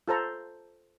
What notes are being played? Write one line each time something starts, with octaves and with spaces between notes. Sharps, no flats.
F4 A4 C5 A#5